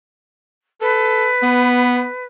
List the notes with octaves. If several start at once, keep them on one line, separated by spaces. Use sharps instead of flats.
A4 B4
B3